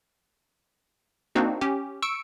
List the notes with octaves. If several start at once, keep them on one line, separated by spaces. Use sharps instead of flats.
A#3 C4 D4 D#4 F#4
C#4 G4
C#6 E6 C#7 D7